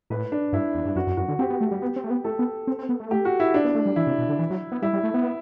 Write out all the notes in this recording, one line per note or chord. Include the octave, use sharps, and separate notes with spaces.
A2 B4
D4
G2 E4
E2
G2
F#2 F#4
F#2
F#2 F#4
D3
C4 G4
B3
A3
G3
B3
C4
A3
B3
A3 A4
B3
C4
C4
B3
A3
G4
F#4
E4
D4
B3
A3
G3
E3 E4
C3
B2
D3
E3
F#3
B3
G3 E4
G3
A3
B3